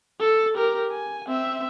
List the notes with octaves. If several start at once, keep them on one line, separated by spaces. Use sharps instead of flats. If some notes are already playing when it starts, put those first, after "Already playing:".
A4
G4 A#4
G#5
C4 E5